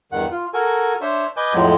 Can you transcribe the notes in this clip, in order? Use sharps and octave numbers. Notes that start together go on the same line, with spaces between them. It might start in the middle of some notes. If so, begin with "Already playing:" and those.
E2 G2 D#3 F#5
F4
F#4 A4 A#4 G#5
D4 C5 C#5 E5
B4 D#5 G#5 D6 G6
F2 A2 F3 F#3 G#3 C4